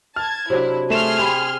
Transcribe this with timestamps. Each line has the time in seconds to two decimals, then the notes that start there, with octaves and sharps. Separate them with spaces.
0.16 A5 F6 G#6
0.50 C3 F#3 D4 E4
0.90 A3 G#4 C6 F6 E7
1.19 G4 B5